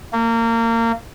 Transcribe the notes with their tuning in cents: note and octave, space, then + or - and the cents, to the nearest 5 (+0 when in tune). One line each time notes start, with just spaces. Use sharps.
A#3 -25